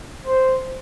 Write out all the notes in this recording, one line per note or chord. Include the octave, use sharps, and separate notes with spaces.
C5